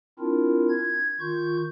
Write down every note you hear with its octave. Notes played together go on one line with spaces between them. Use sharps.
C4 D4 E4 F4 A#4
G#6
D#3 F4 C#6 G6